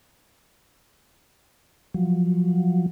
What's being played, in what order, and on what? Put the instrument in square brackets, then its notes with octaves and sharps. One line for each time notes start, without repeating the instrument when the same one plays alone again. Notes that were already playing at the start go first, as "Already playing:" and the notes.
[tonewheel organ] F3 F#3